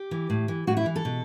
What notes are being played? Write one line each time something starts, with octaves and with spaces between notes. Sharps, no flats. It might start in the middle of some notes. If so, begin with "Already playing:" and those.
Already playing: G4
E3
A2
E3
A2 F#4
E4
E3
A4
B2